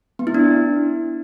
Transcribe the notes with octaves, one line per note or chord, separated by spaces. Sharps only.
B3
E4
D4